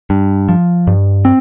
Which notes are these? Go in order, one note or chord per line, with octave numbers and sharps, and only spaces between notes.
G2
F3
G2
C4